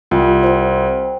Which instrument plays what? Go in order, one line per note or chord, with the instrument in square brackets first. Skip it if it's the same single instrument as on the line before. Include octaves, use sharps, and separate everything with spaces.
[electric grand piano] C2 [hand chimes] F4 G5
[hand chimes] C5 G5